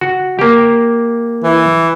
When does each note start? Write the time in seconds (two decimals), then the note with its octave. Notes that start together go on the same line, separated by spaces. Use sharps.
0.01 F#4
0.39 A#3 G4
1.44 E3